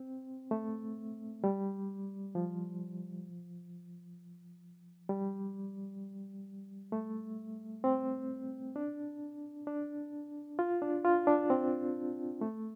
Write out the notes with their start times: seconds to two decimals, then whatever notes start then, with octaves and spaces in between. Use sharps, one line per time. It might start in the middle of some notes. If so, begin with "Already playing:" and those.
Already playing: C4
0.51 A3
1.44 G3
2.35 F3
5.09 G3
6.92 A3
7.84 C4
8.76 D4
9.67 D4
10.59 F4
10.82 D4
11.05 F4
11.27 D4
11.50 C4
12.41 A3